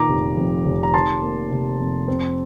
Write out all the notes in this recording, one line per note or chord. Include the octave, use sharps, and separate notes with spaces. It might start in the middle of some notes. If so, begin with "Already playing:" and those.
Already playing: A#2 D#3 A#5 D6
F1
F2
F1
A#5
D#3 A5 C6
A#3
C3
F2
C4